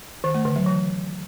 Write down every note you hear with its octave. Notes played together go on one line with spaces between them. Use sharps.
D#3
A3
D3
F#3
E3